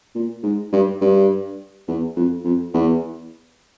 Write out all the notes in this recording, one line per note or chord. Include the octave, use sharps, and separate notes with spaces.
A#2
G#2
G2
G2
E2
F2
F2
E2